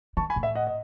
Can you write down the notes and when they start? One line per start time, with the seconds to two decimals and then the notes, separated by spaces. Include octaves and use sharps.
0.17 D#3 A5 C#6
0.30 G#5 B5
0.36 A2
0.43 E5
0.55 D#5 F#5
0.67 D#5